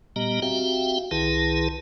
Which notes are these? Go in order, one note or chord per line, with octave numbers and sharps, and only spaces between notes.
A#2 G3 B3 G4 D#5 A#5
C4 F#4 G4 E5 F5 G5
C2 D#3 E4 G#4 B4 A5